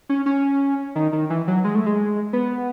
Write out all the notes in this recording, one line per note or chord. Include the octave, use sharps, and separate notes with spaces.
C#4
C#4
D#3
D#3
E3
F#3
G#3
A3
G#3
B3